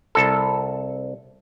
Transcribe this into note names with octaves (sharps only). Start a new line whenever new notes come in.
C2 A4